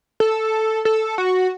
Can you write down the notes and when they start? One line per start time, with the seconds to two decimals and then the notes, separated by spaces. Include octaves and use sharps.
0.20 A4
0.85 A4
1.18 F#4